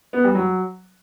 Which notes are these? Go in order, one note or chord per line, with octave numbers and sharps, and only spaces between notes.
B3
G3
F#3